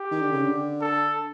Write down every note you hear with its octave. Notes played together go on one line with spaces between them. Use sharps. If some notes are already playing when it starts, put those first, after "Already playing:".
Already playing: G4
D#3
D3
C#3
D3
A4